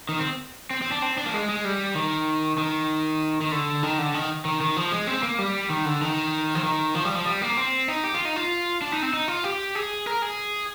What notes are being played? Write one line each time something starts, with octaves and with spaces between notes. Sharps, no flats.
D#3
C4
C4
C4
D4
C4
D4
A#3
G#3
G#3
G3
D#3
D#3
D#3
D3
D#3
D3
D#3
D#3
D#3
F3
G#3
C4
A#3
G3
D#3
D3
D#3
F3
D#3
F3
G3
F3
G3
A#3
C4
D#4
G4
F4
D#4
F4
D4
D#4
C4
D#4
F4
G4
G#4
A#4
G#4